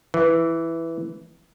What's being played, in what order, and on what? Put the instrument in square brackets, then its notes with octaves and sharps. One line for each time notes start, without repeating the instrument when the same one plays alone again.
[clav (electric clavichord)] E3